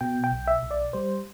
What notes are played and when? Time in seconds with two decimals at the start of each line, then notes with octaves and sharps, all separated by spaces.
0.01 B2 G5
0.24 G5
0.32 B1
0.47 E5
0.63 B1
0.71 D5
0.93 G3 C5